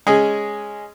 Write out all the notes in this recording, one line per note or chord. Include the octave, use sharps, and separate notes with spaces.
G#3 C#4 G#4